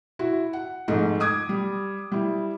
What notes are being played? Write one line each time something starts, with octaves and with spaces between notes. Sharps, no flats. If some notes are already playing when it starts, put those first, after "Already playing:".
E4 F#4
F#5
F2 G#2 A3 D#4
D6 D#6 G#6
G3
G3 E4